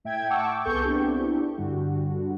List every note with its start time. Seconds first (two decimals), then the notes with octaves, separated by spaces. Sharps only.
0.04 A2 E5 G5 G#6
0.29 F#5 G5 A5 C#6 D6 E6
0.65 C2 B3 G#4 A4 C#6 G6
0.84 B3 C4 D4 E4 G4
1.57 G2 D3 G3 F#4